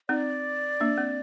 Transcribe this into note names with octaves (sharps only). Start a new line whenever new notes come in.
C4 D#4 D5
A#3 D4
C4